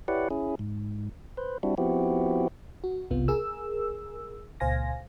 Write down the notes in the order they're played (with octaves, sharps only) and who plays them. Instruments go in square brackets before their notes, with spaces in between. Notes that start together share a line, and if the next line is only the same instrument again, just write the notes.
[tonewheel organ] E4 G4 B4 C#5 D5 F#5
C#4 E4 G#4
G#2
B4 C5
G3 C4 D4 E4 F#4
F3 B3 C4 E4 F#4 G4
[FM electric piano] F#4
G1 C2 C3 B3 F4
G#4 A#4 E6
C#2 A#2 C5 F5 G#5 A#6